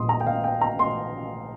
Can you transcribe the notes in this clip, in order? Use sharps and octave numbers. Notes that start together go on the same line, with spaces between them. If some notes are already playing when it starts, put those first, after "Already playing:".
Already playing: A#1 A#2 G3 A#3 C6 D#6
A#5
G5
F5
G5
A#5
C6